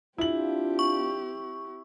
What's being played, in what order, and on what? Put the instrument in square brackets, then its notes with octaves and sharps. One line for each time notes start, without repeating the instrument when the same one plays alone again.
[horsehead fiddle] C4 G4 [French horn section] D4 F4 [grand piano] E4 F#7
[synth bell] C#6